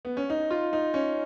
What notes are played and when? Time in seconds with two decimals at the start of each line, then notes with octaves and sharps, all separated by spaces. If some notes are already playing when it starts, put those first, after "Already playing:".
0.05 B3
0.17 C#4
0.30 D#4
0.51 F4
0.73 D#4
0.94 C#4